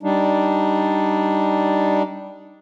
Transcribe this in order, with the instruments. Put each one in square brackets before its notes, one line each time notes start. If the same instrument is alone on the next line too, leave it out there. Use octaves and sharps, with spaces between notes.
[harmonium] G3 D4 D#4